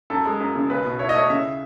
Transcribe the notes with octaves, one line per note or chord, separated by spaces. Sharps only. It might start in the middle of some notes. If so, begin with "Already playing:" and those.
F#2 A4
G#3
F#2
C#3
B1 B4
B2
E4 C#5
D#5
A3 C#5
C#3 E5